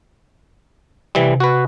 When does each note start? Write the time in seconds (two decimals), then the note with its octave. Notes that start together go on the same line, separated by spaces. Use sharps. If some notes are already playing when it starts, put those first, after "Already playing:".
1.15 C3 E3 G3
1.40 F#4 B4